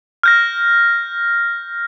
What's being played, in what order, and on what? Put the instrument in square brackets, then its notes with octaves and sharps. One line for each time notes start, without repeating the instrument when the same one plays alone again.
[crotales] F6 G6 A#6